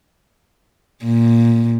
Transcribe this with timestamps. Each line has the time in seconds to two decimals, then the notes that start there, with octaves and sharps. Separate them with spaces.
1.04 A#2